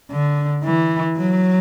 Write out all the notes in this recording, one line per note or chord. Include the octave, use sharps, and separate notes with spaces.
D3
E3
F#3